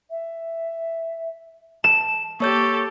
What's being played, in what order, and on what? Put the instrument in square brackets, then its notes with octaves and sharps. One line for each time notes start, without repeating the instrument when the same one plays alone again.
[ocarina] E5
[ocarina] A5 [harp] E7
[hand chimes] A#3 C#5 G6 [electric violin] G4 A4 [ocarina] C#6